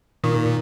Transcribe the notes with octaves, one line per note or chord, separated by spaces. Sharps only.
A#2 D#3